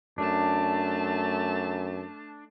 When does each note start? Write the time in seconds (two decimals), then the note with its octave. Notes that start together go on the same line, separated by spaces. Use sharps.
0.18 F#2 A3 D4 A5